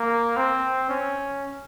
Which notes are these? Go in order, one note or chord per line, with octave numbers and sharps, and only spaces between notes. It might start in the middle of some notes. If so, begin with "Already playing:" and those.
Already playing: A#3
C4
C#4